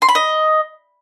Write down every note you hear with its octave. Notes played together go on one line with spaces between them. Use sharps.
C6
B5
D#5